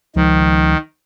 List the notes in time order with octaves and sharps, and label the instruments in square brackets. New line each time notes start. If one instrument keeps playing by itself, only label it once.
[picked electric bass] C#2 F3 [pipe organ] D#3